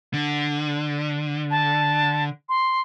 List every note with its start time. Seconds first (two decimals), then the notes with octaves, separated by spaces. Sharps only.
0.14 D3
1.51 A5
2.49 C6